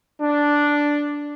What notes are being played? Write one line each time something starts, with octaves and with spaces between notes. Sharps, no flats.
D4